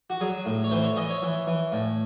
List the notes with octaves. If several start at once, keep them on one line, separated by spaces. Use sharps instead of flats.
F#4
F#3 G#4
A2
C#5
E3 C5
C#5
E3 D#5
C#5
E3
E3
A2